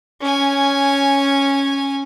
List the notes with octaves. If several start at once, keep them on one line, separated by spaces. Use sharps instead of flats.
C#4 G#5